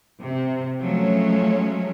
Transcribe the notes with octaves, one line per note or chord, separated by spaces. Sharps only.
C3
F3 F#3 G#3 A3 C#4